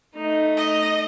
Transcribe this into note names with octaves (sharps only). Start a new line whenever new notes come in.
A3 D#4
D#5